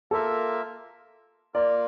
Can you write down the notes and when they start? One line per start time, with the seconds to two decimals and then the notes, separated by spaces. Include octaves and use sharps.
0.11 A#3 F4 A4 A#4 E5
1.54 A#3 F4 A#4 D5